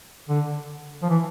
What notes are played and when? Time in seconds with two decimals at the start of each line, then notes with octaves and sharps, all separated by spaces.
0.29 D3
1.02 F3
1.09 E3